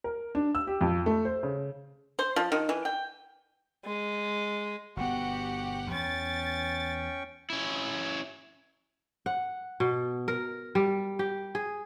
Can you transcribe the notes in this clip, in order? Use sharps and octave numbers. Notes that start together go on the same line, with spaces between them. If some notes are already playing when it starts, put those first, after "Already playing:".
A#4
D4
E6
G4
F2
A3
C5
C#3
C5
F3
D#3
E3
G5
G#3
G1 B2 B3 F#4 G4 F#5
E2 C#4 G5 C#6 A6
C#4 E4
F#5
B2
A#4
G3
G4
G#4